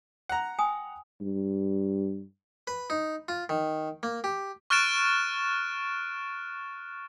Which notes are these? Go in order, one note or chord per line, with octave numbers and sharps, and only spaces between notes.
F#5 A#5
G5 G#5 D#6
G2
B4
D#4
F4
D#3
A#3
G4
C#6 F6 F#6 A6 D7 E7